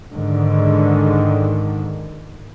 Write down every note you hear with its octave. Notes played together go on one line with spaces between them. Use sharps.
G#2 D3 D#3